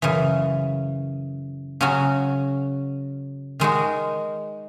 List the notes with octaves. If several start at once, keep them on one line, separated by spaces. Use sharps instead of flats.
F#2 C#3 E3
C#3 F#3 C#4 F#4
D#3 G#3 D#4 F#4